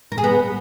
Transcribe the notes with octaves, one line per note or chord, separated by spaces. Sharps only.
A#4
G#4
B3